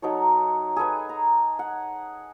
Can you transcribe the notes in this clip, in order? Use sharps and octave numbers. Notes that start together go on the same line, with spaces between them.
F#3 D#4 A4 C#5
G#4 A4 B4 G#5
A#5
F#5